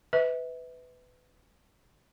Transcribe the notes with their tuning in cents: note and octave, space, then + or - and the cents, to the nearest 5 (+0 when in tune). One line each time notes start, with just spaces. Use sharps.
B4 +20 E5 -35